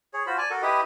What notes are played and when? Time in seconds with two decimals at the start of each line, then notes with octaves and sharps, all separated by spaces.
0.14 G#4 C#5
0.26 F4 F#4 C5 B5
0.38 D5 G#5 A5
0.50 F#4 A4 A#4
0.62 E4 G4 B4 D#5